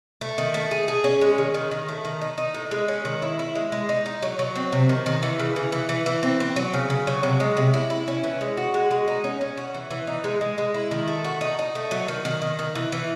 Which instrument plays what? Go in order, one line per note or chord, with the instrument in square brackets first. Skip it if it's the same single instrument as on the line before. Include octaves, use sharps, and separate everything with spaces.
[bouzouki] A3
D#3
A3
G#4
G#4
C#4
G#3
D#3
D#3
D#3
A3
D#3
D#4
D#4
A2
G#3
C#4
D#3
E4
E4
G#3
G#3
D#4
D#4
F#3
F#3
C4
C3
D#3
D#3
E3
C#3
E3
E3
E3
E3
C4
C4
F#3
C#3
C#3
F#3
C3
G#3
C3
E4
E4
C#4
E3
G#3
F#4
G#3
G#3
D#4
C#4
C#4
F#4
E3
E3
D#4
G#3
G#3
G#3
E4
D#3
A3
F#4
D#4
D#4
A3
F#3
D#3
D#3
D#3
D#3
E3
E3